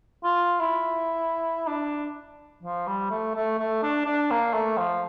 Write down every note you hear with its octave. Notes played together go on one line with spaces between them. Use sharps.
F4
E4
D4
F3
G3
A3
A3
A3
D4
D4
A#3
A3
F3